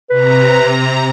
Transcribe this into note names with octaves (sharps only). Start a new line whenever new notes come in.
C3 B4 A#5